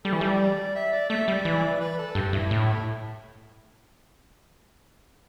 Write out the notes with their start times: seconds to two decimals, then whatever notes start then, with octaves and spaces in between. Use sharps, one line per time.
0.05 G3 A4
0.13 E3
0.21 G3 D5
0.75 E5
0.93 D5
1.10 A3 E5
1.28 G3 D5
1.45 E3
1.80 B4
1.98 A4
2.15 G2 G4
2.27 G4
2.33 G2 E4
2.51 A2